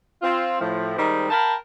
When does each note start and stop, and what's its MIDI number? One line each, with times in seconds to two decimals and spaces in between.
0.22 0.58 60
0.22 0.58 65
0.60 0.93 45
0.60 0.93 53
0.96 1.27 51
0.96 1.27 55
0.96 1.27 56
0.96 1.27 60
0.96 1.27 63
1.30 1.53 70
1.30 1.53 77
1.30 1.53 79
1.30 1.53 81
1.30 1.53 83